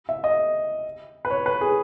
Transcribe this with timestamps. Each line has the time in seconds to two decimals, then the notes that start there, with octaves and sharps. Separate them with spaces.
0.09 E5
0.24 D#5
1.25 B4
1.30 C#5
1.46 B4
1.61 G#4